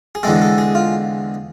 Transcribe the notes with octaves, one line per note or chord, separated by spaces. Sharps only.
G#4
E2 D3 G#3 C4 A4
A4
G#4
F4